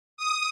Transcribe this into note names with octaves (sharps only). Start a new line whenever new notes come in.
D#6